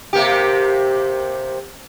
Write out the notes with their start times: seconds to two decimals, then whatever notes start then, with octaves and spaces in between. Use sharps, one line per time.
0.13 C3 A#3 G4